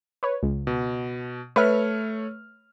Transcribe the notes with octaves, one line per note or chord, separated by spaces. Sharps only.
B4 C#5
C#2
B2
A3 B4 C#5 E5 F6